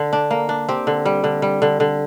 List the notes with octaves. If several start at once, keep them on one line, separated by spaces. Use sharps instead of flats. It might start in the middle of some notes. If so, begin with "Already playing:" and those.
Already playing: D3
D4
A#3
D4
C4 G4
D3
G3
D3
G3
D3
D3